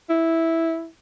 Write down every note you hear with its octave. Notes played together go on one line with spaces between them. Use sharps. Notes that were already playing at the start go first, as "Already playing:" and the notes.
E4